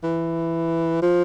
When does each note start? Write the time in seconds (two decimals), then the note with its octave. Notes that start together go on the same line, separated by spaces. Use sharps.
0.03 E3
1.02 F3